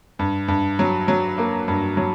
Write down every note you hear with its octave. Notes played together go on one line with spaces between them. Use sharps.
G2
G2
F#3
F#3
A#3
G2
F#3